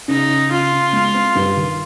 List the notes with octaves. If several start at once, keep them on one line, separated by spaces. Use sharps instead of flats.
C#3 D#4
C#3
C#3 F4
C#3
G#3
C4
G2
D#3